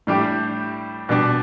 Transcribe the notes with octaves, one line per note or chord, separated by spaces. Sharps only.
A2 G3 D4 G4
B2 G3 D4